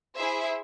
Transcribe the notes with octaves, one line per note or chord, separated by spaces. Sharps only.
E4 G#4 C5 E5